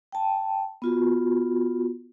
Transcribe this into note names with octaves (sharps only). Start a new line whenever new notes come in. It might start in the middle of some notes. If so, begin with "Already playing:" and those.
G5 A5
B3 F4 F#4